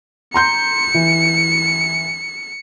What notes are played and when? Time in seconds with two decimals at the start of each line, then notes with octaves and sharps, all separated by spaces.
0.34 A#5 C6 G6 C#7
0.94 E3